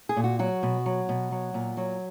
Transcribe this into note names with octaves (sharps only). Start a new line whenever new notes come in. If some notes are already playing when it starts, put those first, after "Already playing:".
G#4
A#2
F#4
F#3 F#4
B2
F#3
B2
F#3
A#2
F#3